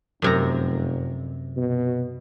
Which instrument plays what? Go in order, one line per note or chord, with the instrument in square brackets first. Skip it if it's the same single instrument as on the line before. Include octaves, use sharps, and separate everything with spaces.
[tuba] F1 [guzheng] F#2 C3 A#5
[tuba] B2